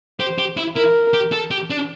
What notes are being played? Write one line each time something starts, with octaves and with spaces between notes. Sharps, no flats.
G4 C5
G4
E4
E4 A#4
G4
A4
G4
D4